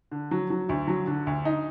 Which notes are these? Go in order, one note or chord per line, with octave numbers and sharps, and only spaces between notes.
D3
F#3
F#3
D2
F#3
D3
D2
D#4